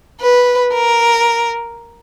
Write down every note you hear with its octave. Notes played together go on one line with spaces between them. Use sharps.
B4
A#4